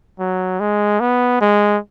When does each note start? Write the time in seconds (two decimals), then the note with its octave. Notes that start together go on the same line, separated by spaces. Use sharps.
0.19 F#3
0.60 G#3
1.00 B3
1.41 G#3